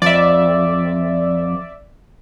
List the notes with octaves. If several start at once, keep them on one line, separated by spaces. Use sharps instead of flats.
F2 D5 E5